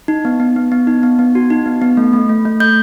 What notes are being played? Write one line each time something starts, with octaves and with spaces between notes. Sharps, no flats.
D#4
B3
B3
B3
B3
D#4
B3
B3
F#4
D#4
B3
B3
A3
A3
A3
A3
A3 G6